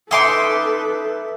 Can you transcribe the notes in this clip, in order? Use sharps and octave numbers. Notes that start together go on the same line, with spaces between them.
D#4 A4 B4 E5 C6 D6